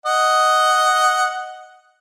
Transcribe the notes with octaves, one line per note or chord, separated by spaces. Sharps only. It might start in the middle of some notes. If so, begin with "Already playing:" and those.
D#5 F#5